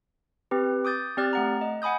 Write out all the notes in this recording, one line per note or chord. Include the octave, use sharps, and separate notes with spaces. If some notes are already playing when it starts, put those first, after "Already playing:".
C4 G4 B4
D6 D#6 G6 A6
C4 G4 D5 F6 F#6 A6
A3 F#5 A#5
D#5
F#5 G#5 B5 D#6 G6